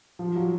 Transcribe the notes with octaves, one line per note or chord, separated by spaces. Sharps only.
F3
F#3